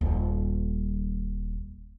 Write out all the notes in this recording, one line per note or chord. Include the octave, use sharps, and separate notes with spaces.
D#1 G3